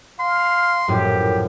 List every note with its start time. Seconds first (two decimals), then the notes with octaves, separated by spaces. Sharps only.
0.19 F5 C6
0.88 A#1 F#2 A2 G4